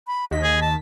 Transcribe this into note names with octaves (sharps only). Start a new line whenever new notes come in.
B5
D#2 D#5 B6
G#4
A5